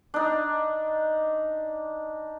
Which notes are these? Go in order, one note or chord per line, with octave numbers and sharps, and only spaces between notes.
D4 D#4